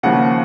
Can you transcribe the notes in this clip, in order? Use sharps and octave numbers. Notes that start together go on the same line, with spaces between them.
D#2 C#3 F3 F#5